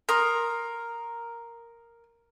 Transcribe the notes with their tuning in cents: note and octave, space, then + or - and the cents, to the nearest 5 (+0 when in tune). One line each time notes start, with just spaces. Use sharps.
A#4 +0 C6 +15 D#6 +0